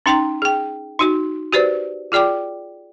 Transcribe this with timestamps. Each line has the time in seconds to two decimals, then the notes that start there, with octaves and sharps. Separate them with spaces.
0.06 C#4 D#4 G5 A#5 C6
0.42 G#4 G5
0.99 D#4 F#4 C6
1.53 F#4 G4 B4 C5 D5
2.12 F4 G#4 D5 G5 D6